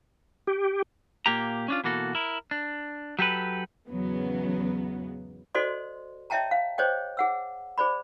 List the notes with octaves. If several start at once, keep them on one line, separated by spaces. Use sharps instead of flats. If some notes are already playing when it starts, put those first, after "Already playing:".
G4
A#2 A#3 G4 A#5
C#4 D4 F4
B2 E3 A#3 F#4 A4
E4 A#4
D4
F#3 G4 A4 B4
E2 G#2 C#3 F#3 B3
F#4 A4 C5 D5 D#5 C6
C#5 D#5 E5 G5 A5 A#5
F5
G#4 C5 C#5 D#5 G5
G#4 F#5 E6
G#4 C5 D5 B5